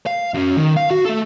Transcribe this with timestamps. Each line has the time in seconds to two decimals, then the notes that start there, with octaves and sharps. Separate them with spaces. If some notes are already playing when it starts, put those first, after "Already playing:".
0.06 F5
0.34 F#2 C#4
0.57 D#3
0.77 F5
0.91 F#4
1.05 A3 A4